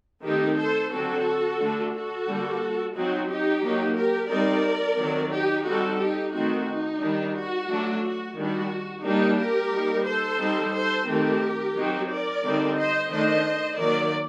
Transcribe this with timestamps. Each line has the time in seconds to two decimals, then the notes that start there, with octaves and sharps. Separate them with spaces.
0.23 D#3 A3 C4 D#4 G4 A#4
0.57 A4 C5
0.91 D3 F#3 C4 F#4 A4
1.59 D3 A3 D4
1.93 F#4 A4
2.28 D3 G3 A#3
2.94 F#3 C4 D#4 F#4
3.28 D#4 G4
3.63 F#3 A#3 D#4
3.97 G4 A#4
4.30 G3 C4 D#4 A#4 D5
4.98 D#3 F#3 C4
5.31 D#4 G4
5.66 G3 C4 D#4 F#4 A4
5.99 D#4 G4
6.34 D#3 A3 C4 D#4 F#4
6.68 D#4
7.01 D#3 G3 D4
7.36 F#4
7.69 F#3 A3 D4
8.03 F#4
8.37 D#3 G3 D4 F#4
9.05 G3 A#3 D4 D#4 G4
9.38 G4 A#4
9.72 G3 A#3 D#4
10.06 A4 C5
10.40 G3 C4 D#4
10.74 A4 C5
11.08 D#3 A3 C4 D#4 G4 A#4
11.76 F#3 C4 D#4
12.10 A#4 D5
12.44 D3 G3 C4 D#4
12.78 C5 D#5
13.11 D#3 A3 D4 C5 D#5
13.79 D#3 F#3 A#3 A#4 D5